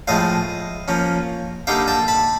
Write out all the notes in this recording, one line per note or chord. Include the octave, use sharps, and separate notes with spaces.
A2 F3 G#3 D#5 F5
F3 A#3 C#4
D3 G3 A#3 D#4 F5 G5
G5 A5
A5 B5